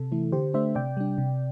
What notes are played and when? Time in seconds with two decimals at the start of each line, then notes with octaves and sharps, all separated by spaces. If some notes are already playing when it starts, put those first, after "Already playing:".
Already playing: C3 A4
0.12 E3 A3 E4
0.32 D3 G4 C5
0.54 A3 D4 C5 E5
0.75 C3 D5 G5
0.97 G3 D4
1.18 C3